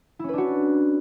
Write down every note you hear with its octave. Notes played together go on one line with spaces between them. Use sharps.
C#4 D4 E4 F#4 B4